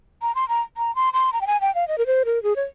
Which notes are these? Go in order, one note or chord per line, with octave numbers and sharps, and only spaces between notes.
A#5
C6
A#5
A#5
C6
C6
A#5
G5
G#5
G5
F5
D#5
A#4
C5
A#4
G#4
C#5